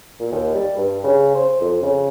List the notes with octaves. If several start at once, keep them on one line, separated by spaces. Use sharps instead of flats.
A#2
D#2
G3
G2
C#3
C5
F2
C#3